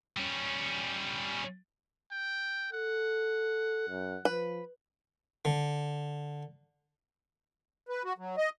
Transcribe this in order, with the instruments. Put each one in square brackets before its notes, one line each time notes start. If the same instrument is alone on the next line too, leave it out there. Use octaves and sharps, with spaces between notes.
[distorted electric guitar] G3 C#4
[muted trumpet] G5
[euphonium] A4 [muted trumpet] F#5
[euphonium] F#2
[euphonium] F3 [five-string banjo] B4
[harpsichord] D3
[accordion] B4
F#4
F#3
D#5